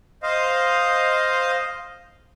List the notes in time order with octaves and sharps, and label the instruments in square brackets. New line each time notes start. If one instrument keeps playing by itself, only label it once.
[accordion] C5 D#5 F5